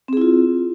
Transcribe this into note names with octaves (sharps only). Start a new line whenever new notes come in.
C4 E4 F4 G#4